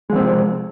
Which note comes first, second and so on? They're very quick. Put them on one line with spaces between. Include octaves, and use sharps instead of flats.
G#3 F3 C4 C3